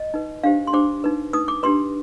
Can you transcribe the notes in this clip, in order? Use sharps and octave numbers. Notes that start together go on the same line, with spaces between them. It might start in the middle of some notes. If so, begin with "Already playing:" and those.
Already playing: D#5
D#4 B4
D4 G4 C5 F5
C6
D4 G4 C5 D6
D#4 B4
D#4 B4 D#6
D6
D4 G4 B4 C6